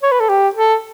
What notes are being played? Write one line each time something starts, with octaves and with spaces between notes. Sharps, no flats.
C#5
B4
A4
G4
A4